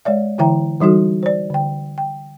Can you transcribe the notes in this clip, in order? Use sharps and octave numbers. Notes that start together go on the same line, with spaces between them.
G#3 C#5 D5 E5
D3 E3 E4 E5 G5 A#5
E3 G3 D#4 F#4 A4
C5 D5
D3 G5
G5